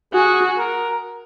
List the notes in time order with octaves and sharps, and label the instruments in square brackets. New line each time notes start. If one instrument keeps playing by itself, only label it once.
[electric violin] F#4 [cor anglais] G#4
[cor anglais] A#4